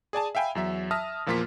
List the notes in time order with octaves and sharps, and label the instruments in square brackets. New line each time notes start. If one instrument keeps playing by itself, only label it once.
[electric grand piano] G#4 D5 G#5 A5
E5 F5 G5 G#5 B5
E2 F#3 E5
E5 A5 D#6 F6 A#6
E2 A#2 F3 A#3 F4 B6